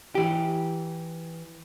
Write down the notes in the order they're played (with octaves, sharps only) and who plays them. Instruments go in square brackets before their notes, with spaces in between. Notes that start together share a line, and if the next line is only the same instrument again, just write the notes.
[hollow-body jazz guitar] E3 G4